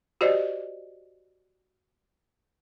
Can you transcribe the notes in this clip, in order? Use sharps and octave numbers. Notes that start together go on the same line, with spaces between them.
F#4 G4 C5 D5 D#5